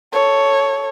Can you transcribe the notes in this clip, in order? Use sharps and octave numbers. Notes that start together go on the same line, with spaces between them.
A4 C#5